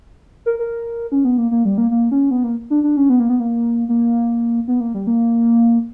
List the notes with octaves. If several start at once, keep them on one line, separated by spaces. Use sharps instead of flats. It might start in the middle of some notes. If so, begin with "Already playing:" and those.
A#4
A#4
C#4
B3
A#3
A#3
G3
A#3
A#3
C#4
B3
A#3
D4
D4
C#4
B3
A#3
B3
A#3
A#3
B3
A#3
G3
A#3